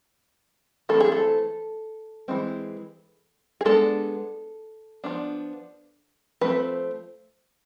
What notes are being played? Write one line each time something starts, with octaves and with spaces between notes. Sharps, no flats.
E3 A3 C4 A4
G#4
A4
E3 G#3 C4
G#4
G#3 B3 D4 A4
F3 B3 D4
F3 A3 C4 B4